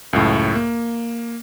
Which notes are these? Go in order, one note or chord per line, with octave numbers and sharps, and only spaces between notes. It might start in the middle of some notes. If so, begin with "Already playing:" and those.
C#2 F#2 A2
A#3